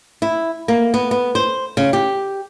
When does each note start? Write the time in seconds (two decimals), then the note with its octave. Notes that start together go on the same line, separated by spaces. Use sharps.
0.22 E4
0.68 A#3
0.94 B3
1.11 B3
1.35 C5
1.77 C#3
1.93 G4